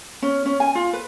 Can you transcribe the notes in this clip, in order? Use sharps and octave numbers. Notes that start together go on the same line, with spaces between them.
C#4
C#4
G#5
F4
B4